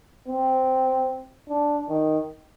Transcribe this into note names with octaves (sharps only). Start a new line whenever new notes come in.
C4
D4
D#3